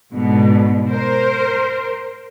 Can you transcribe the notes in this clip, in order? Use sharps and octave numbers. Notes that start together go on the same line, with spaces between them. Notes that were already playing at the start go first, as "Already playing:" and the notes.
G#2 B2 D3
A#4 C5